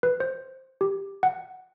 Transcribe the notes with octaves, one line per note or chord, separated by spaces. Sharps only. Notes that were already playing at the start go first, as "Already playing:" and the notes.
B4
C5
G4
F#5